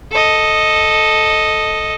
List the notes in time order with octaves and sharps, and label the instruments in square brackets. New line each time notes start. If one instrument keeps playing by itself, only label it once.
[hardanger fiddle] A4 D#5